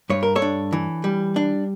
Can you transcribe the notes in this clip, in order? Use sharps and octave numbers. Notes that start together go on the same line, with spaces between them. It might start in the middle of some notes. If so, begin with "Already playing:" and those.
G2 C#5
A#4
A4 C#5
D4
E3
G3
D4